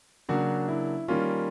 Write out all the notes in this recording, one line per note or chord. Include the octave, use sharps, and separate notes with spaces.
C#3 F#3 A#3 D4 F#4
E4
D#3 G3 A#3 C#4 F4